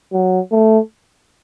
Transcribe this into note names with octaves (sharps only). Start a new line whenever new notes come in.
F#3
A3